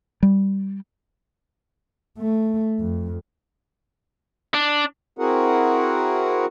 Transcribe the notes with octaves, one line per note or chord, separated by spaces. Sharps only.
G3
A3
F2
D4
C4 E4 F#4 G#4 A#4 F#5